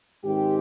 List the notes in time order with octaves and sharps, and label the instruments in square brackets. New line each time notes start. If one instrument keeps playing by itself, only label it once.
[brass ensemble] G#2 D#3 G#3 C4 G4